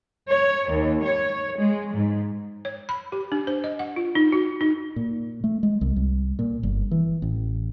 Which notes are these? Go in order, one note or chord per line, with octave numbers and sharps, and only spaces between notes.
C#5
D#2
C#5
G#3
G#2
C#5
B5
G4
D4
C5
D#5
F#5
F4
D#4
F#4
D#4
A#2
A3
G#3
C2
C2
A#2
G1
E3
A1